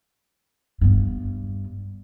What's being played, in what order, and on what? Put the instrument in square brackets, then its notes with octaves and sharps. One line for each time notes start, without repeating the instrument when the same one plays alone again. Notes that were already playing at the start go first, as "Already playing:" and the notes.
[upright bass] G2 B3